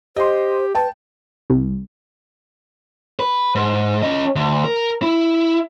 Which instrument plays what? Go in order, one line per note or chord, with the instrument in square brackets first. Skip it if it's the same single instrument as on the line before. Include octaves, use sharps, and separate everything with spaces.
[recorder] G4 [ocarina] C5 [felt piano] D#5 C6
[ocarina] B4 [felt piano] G5 A5
[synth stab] C2
[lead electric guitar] B4
G#2
C#4 D#5
D2
A#4
E4